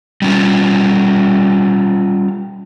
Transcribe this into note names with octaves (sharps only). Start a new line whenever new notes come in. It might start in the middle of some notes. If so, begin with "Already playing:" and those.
G3 C#4 F4